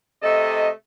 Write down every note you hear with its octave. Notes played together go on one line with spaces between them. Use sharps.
C3 A3 A4 D#5